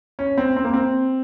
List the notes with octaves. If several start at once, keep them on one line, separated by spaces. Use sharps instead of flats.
C#4
C4
C4
A#3
C4